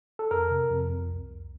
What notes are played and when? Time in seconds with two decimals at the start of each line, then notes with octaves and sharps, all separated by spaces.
0.19 A4
0.31 F2 A#4
0.50 C3
0.70 F2
0.90 F2
1.09 C2
1.30 C2